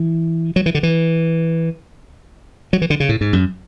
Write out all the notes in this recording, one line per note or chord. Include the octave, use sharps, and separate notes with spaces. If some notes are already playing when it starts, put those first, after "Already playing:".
Already playing: E3
F#3
E3
D3
E3
F#3
E3
D3
C#3
A2
G#2
F#2